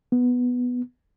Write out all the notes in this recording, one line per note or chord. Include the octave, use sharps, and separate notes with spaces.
B3